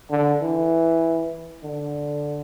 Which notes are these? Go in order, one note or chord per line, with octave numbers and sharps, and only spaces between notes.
D3
E3
D3